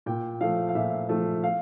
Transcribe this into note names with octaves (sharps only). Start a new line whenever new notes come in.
A#2 G5
F3 A3 F5
F5
A#2 E5
F3 A3
F5